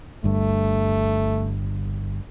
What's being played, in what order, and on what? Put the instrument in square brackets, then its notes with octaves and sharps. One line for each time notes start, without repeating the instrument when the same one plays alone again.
[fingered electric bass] G1 G2 [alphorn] A3